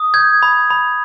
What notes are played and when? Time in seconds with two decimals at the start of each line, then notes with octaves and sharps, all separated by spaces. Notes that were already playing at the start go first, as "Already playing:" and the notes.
Already playing: D#6
0.14 G6 G#6
0.43 B5
0.70 B5